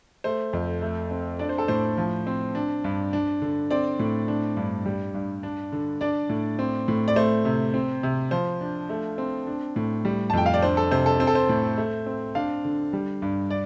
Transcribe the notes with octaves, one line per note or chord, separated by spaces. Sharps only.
A3 C5
F2
A3
C4
D4 D5
C5
A4
A2 C5
F3
C4
D4
G2
D4
D3
C4 D5
A2
D4
G2
G3
G2
D4
D3
D4 D5
A2
C4
A2
D5
A3 C5
C3
C4
C3
F3 C5
D4
A3
C4
D4
A2
G3
A5
F2 G5
F5
D5
D4 C5
A4
C3 C5
A4
C4 C5
A4
C5
A2
A3
C4
D4 F5
D3
G3
G2
D5